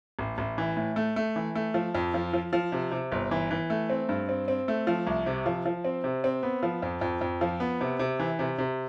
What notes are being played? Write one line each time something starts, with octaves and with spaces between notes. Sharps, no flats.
A1
A1
E3
A2
A3
A3
E3
A3
F3
F2
F3
F3
F3
C3
C3
G1
E3
E3
A3
C4
G2
C4
C4
A3
F3
C2
C3
F3
F3
C4
C3
C4
B3
F3
F2
F2
F2
F3
B3
C3
C3
E3
C3
C3